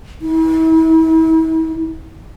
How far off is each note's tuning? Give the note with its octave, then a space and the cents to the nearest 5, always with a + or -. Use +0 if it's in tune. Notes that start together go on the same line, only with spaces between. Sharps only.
E4 -40